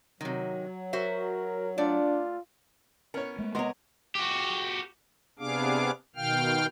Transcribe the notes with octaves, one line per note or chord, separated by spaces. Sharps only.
C3 D#3 F#3
F#4 A#4 C5 E5
A3 D4 F4 D5
B3 C#4 A#4 C#5
G#3 A3
C3 B3 A#4 C#5 D#5 C6
F#4 G4
C3 B3 D4 G#4 F5 D6
B2 D#3 F5 G5 F6